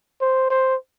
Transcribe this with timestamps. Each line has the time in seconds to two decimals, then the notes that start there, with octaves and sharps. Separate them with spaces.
0.21 C5
0.50 C5